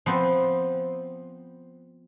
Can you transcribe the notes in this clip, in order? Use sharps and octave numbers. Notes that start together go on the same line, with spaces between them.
F3 B3 C4